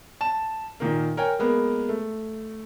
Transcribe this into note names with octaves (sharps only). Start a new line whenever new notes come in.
A5 E7
A#2 D#3 A#3
A#4 C#5 G5 G#5
G#3 A#3 B3
A3